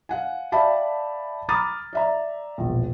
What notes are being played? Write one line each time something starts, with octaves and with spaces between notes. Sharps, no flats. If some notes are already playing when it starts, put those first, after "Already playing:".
F5 F#5 G#5
D5 E5 F5 G5 A5 B5
A#5 B5 D6 D#6 F6 A6
D5 E5 A#5
E1 A#1